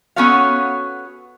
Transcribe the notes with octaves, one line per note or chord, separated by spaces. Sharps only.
B3 C#4 F#4 A4 C#5 F5